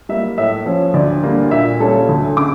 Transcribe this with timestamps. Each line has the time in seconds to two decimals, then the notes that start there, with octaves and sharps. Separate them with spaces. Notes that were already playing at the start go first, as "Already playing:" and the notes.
0.09 G3 A#3 E5
0.38 A2 E5
0.66 F3 C#4
0.94 D2 D5
1.23 D3 G3 A#3
1.51 A#2 E5
1.80 G3 C#4 A4
2.09 D2
2.36 C#3 D6